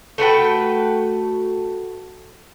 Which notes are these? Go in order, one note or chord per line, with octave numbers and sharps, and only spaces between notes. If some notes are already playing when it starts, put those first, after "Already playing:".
A3 F#4 B4 G5